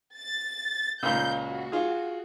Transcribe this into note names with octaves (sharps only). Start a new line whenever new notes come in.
A6
C#2 A#2 G6
F#4
F4 G#4